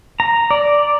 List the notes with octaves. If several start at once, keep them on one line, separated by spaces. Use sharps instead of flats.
A#5
D5